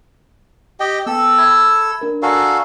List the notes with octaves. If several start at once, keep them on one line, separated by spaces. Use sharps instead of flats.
G4 D#5 G5
B3 A4 G5 E6
E5 B5 G#6
D4 A#4
F#4 A4 D5 F5 G#5 A#5